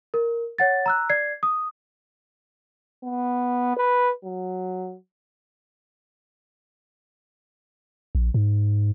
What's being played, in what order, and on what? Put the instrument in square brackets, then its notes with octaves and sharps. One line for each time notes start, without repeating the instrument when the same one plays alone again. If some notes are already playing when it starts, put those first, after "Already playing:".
[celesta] A#4
C#5 F#5 A6
A#5 E6 F#6
D5 G#6 C7
D#6
[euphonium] B3
B4
F#3
[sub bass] A#1
G#2